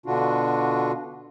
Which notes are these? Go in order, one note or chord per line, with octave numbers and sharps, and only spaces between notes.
B2 D3 D4 F4 F#4